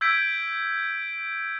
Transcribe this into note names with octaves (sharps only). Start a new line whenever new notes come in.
E6 G6 G#6 B6 D7